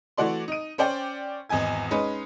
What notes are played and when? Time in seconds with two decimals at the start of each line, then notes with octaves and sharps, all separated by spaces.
0.17 E3 A3 F#4 D5 C6
0.48 D#4 D#7
0.78 C#4 C5 D5 G5
1.49 G#1 E2 D#5 G#5 G#6
1.91 G#3 C#4 D#4 B4